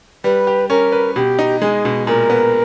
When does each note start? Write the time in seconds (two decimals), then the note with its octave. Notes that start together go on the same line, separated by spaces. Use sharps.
0.24 G3 B4
0.47 G4
0.69 C#4 A#4
0.92 B4
1.16 B2 G4
1.39 D#4
1.62 G#3 G#4
1.85 B2
2.07 A#2 A#4
2.30 B3